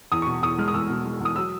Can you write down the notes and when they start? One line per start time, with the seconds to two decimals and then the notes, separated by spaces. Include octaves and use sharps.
0.12 E2 D#6
0.22 C#6
0.27 B2
0.42 E2 D#6
0.58 G#3 F6
0.68 D#6
0.74 E2 E6
0.89 B2
1.05 G#3
1.20 E2
1.25 D#6
1.36 F#3 E6